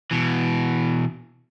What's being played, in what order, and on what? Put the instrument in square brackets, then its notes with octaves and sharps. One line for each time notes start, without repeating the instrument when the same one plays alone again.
[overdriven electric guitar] B2 E3